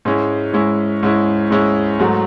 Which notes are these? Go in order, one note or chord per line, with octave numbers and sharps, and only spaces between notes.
G#2 G#3 C#4 E4
G#2 G#3 C#4 E4
G#2 G#3 C#4 E4
G#2 G#3 C#4 E4
G#2 F#3 A3